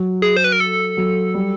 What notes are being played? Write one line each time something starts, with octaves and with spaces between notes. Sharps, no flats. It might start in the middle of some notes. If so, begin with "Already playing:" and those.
Already playing: F#3
G#4
C5
B4
A#4
A4
F#3
G3